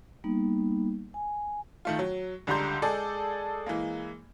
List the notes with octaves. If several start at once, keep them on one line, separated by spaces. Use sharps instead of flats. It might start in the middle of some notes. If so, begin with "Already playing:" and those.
G3 A#3 B3 D#4
G#5
D#3 A3 F4
F#3
C#2 D3 G3 A#5 C6 G6
G#3 G#4 A4 D5
E3 G#3 A#3